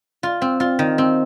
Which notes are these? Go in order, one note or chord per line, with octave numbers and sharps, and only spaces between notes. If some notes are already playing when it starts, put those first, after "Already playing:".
F4
C4
F4
D#3
C4